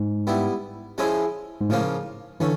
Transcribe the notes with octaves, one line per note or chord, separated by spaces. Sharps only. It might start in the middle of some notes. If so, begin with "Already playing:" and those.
Already playing: G#2
G3 B3 E4
F3 G#3 C#4 E4 G#4
G#2
A2 C#3 F3 A#3 C#4
D3 E3 A3 C#4